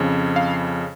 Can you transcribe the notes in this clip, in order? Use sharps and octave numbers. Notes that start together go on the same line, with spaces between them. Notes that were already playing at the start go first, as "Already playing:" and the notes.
Already playing: F2 C#3
F5